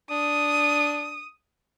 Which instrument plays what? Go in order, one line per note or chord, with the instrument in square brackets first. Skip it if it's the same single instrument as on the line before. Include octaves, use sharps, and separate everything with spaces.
[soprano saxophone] D4 [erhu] D#6